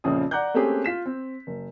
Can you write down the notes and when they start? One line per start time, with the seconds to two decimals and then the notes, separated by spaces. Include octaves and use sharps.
0.04 A#1 F2 C#3 F3 C#4 D#6
0.31 D5 F#5 A#5 D6 F#6 G6
0.54 A3 A#3 C4 C#4 G4 G#4
0.84 F4 B6 E7
1.06 C4
1.47 F#1